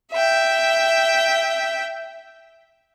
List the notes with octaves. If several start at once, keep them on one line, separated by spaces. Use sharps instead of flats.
E5 G5